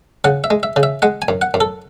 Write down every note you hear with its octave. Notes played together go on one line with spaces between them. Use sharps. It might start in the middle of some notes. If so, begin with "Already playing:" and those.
C#3 F#5
E5
G#3
E5
C#3
E5
G#3 F#5
G#5
F#2
F#5
F#2
A4